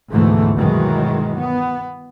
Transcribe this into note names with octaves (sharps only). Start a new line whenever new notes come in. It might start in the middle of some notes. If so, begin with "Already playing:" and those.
D2 G#2 B2 E3 F3 A3
G2 B2 D#3 E3 F#3 G#3
B3